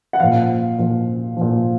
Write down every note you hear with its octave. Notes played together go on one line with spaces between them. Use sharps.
F#5
A#2 F3 F5
A#2 F3
A#2 F3